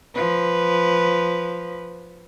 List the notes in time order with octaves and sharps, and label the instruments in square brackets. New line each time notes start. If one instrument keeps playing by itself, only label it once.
[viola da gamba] F3 B4